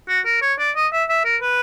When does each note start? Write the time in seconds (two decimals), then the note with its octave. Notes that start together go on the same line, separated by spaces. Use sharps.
0.09 F#4
0.26 A#4
0.42 C#5
0.59 D5
0.76 D#5
0.93 E5
1.09 E5
1.25 A#4
1.42 B4